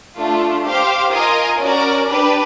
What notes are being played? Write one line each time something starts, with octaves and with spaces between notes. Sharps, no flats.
A3 D4 F4
G4 C5 F5
F4 A#4 D#5 G#5
C#4 F#4 A#4 D5
D4 G4 B4